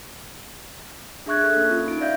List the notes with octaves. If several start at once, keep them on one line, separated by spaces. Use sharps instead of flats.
D4 G#4 E5 C#6 F#6 G#6
A4
A#3 C#4
F4
D#4 D7
D5 E5 F5 G6